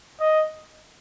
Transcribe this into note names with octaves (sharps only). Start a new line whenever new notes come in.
D#5